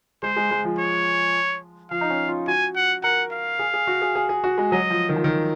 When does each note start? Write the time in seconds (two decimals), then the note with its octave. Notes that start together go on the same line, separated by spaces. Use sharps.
0.23 G#3 C5
0.36 G#3
0.51 G#3
0.65 F3
0.79 C#5
1.91 F3 F5
2.01 D#4
2.10 C#4
2.28 F4
2.47 F#4 G#5
2.76 F#5
3.04 A#4 F#5
3.32 F5
3.59 G#4
3.74 G#4
3.87 F#4
4.02 G#4
4.15 G#4
4.29 G#4
4.44 F#4
4.58 G#3
4.72 F#3 D#5
4.90 F3
5.09 D#3
5.16 F3
5.24 D#3